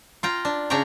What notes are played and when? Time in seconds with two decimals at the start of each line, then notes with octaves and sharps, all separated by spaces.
0.23 F4 G5 A#5
0.45 D4
0.70 C#3 D4 C#5 G5 A#5